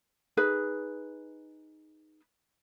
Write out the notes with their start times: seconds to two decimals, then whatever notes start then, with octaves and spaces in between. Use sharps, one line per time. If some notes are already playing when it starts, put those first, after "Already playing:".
0.37 D#4 G#4 B4